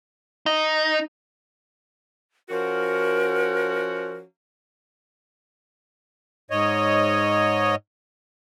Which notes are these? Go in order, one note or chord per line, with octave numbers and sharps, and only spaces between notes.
D#4
F3 C#4 F#4 A#4
G#2 C#5 D#5